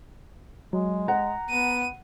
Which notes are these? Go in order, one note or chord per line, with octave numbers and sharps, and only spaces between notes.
F#3 G#3
F#5 A#5
B3 D#7